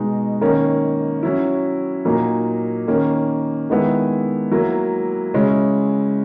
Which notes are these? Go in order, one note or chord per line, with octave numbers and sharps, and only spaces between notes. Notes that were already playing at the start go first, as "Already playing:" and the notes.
Already playing: B2 G#3 D#4
D#3 A#3 C#4
F#3 C#4 E4
A#2 F#3 A#3 D#4
D#3 A#3 C#4
D#3 G#3 B3 E4
F#3 A#3 E4
C#3 G#3 C#4 E4